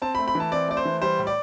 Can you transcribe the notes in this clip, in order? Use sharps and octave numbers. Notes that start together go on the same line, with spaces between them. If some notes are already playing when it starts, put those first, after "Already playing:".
C4 A5
B5
A3
B5
E3
A5
C4 D5
A3 D5
C5
E3
G3 C5
A2
D5